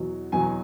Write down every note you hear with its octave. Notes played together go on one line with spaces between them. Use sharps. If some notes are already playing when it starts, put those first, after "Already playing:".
Already playing: E2 B2 F#3
E2 B2 F#3 G#5